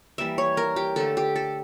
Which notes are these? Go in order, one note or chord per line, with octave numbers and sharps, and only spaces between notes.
E3 G3 A#3 E5
C#5
A#4
G4
D3 A3 A4
G4
A4